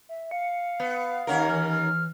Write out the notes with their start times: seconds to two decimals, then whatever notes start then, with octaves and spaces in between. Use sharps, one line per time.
0.09 E5
0.31 F5 C#7
0.80 B3
1.27 D#2 C#4 A#4 F#5
1.49 E3 F6
1.70 F6